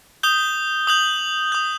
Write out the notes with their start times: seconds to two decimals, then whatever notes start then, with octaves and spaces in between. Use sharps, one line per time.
0.23 D#6 G6 G7
0.87 D#6 G6 F#7
1.52 D#6 G6